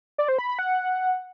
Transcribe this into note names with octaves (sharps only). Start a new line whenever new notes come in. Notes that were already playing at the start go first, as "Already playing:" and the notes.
D5
C5
B5
B5
F#5